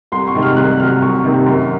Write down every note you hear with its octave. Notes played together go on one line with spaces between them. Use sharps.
C2 C6
C#6
C3 D#3 G#3
F6
C2 F#6
C3 F#3 F6
C2 C#6
C3 D#3 A#3
F#2